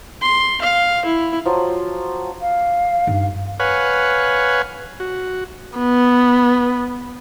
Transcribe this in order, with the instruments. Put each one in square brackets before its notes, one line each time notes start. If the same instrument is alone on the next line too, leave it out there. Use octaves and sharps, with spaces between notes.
[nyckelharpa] C6
F5
E4
[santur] F3 F#3
[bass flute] F5
[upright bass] G2 D#4
[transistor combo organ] B4 C#5 F5 F#5 G#5
F#4
[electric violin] B3